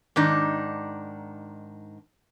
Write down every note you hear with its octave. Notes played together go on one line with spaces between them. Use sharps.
G#2 D#3 D4 D#4